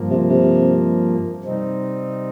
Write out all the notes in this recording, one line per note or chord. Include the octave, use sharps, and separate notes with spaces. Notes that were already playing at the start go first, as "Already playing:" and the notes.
Already playing: G2 F3 A#3
C3
C3
C3 G3 C4 D#4